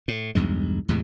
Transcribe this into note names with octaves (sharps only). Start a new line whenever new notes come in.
A2
B1 E2 G2 G#3
E2 A2 C3 G#3